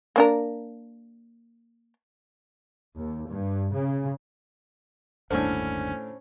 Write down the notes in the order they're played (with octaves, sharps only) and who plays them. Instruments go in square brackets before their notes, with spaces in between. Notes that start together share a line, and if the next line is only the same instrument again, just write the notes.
[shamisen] A#3 D4 A#4
[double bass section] D#2
G2
C#3
[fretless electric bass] G1 D#2 D4 [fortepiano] A2 D3 [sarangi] C#4 [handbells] C5